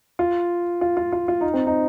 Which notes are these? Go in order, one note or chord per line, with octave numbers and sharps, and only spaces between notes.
F4
F4
F4
F4
F4
D#4
C4
D#4